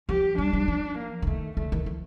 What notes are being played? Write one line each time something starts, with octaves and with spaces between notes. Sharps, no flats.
F3 G4
G3 D4
G3
F3
A#3
D3
D#3 A3
D3 A3
D#3
F3